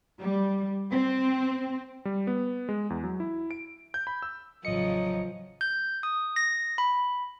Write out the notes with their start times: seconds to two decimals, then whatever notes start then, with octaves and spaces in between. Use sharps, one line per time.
0.21 G3
0.90 C4
2.05 G3
2.27 B3
2.69 G#3
2.90 E2
3.04 F#3
3.20 E4
3.51 D7
3.94 G6
4.07 B5
4.22 E6
4.65 A1 C#3 F3 F#3 D#5 C#7
5.61 G6
6.03 D#6
6.36 A#6
6.78 B5